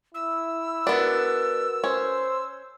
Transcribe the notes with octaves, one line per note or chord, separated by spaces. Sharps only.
E4 E6
B3 D4 F#4 A#4 B4
C#4 C5